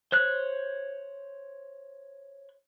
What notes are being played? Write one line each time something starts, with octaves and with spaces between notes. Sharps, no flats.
C5 C#5 F#6